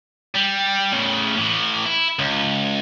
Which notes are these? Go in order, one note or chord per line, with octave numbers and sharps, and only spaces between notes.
G3
A2 C#3
A2 E3
E4
C#2